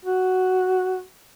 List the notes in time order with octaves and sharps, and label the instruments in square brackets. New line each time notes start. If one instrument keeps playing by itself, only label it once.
[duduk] F#4